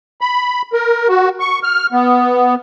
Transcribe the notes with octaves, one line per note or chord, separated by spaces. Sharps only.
B5
A#4
F#4
C#6
F6
B3